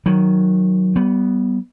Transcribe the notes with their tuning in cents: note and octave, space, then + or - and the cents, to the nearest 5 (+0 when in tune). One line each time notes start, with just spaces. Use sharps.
D#3 +0 F#3 +0
G3 -30 B3 +0